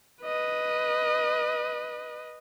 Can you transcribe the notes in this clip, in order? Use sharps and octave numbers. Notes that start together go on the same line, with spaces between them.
B4 D#5